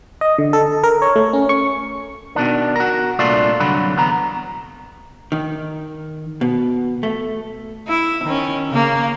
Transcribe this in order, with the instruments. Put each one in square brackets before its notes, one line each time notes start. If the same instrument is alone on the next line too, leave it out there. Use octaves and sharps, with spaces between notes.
[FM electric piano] D#5
D3
A4
A#4
C#5
A3
C#4
C#6
[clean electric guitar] B2 D#3 D4
F#4 A#4
C2 A#2 A3 D4 F4 D5
C2 G2 D3 F#3 F#4 B5
E2 B3 A#5
[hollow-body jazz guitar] D#3
B2
A3
[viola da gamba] E4
D#3 C#4
C#3 A#3